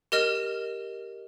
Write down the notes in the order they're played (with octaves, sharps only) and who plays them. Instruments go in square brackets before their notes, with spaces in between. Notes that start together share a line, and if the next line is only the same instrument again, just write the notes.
[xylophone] G4 A#4 D#5 F6 E7